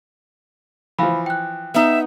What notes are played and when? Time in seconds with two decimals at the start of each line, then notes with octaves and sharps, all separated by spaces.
0.98 E3 F3 F5 B5
1.26 G5 F#6
1.74 B3 D#4 E5